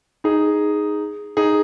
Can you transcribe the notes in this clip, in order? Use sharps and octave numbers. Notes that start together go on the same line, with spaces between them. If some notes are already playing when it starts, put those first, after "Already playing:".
D#4 G#4
D#4 G#4